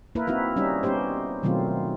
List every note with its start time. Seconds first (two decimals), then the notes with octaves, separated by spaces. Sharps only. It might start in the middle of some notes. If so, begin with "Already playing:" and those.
0.15 A#3 E4 A#4 B4
0.27 C4 D#4 E4 F#4 B4
0.56 G3 C#4 D#4 E5
0.83 B3 C#4 D#4 G4 C5
1.43 B2 D#3 F#3 A3 C4 F4